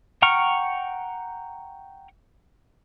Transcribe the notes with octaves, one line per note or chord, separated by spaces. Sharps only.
F#5 G5 A#5 C#6 F6